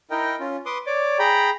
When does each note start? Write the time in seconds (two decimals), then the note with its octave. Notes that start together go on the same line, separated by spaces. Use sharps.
0.11 D#4 E4 A#4 D#5 G5
0.39 C#4 F4
0.66 B4 C6 D6 D#6
0.87 C#5 D5 D6
1.19 G#4 G5 A#5 B5